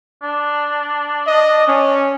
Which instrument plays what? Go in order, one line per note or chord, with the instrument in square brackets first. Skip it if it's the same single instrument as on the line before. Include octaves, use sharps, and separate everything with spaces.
[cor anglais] D4
[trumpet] D#5
C#4